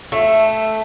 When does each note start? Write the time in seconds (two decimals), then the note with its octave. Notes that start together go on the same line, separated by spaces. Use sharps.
0.12 A3 E5